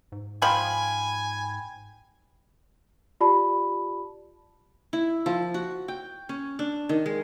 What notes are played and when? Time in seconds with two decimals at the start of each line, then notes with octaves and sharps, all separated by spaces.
0.12 G#2
0.42 F3 G5 G#5 B5
3.21 F4 G4 D5 A5 B5
4.93 E4
5.26 F3
5.54 F#4
5.88 G5
6.29 C#4
6.59 D4
6.89 D#3
7.06 G#3